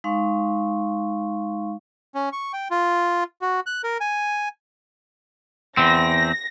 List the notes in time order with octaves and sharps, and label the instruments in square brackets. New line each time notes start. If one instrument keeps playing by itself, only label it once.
[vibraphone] G#3 D#4 F5 C6 C#6
[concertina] C#4
C#6
G5
F4
F#4
F#6
A#4
G#5
[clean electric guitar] E2 C4 [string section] A#6